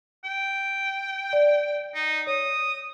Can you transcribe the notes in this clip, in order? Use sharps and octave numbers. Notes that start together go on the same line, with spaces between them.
G5
D5
D#4
C#5 D#6